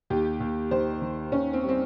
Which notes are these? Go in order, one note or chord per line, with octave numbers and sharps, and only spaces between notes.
D#2 G4
D#2
D#3 C5
D#3
D#2 C#4
C4
G3
C4